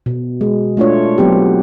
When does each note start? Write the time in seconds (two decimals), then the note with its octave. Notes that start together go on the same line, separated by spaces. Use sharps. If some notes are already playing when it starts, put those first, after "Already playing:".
0.06 B2
0.41 G#3
0.77 A3 D4 F4 C#5
1.18 F#3 B3 C4 G4